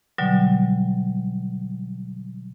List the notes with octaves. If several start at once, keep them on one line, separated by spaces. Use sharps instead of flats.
B2 D3 F#3 G3